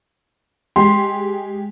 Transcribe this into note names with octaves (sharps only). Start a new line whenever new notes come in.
G#3 G4 C6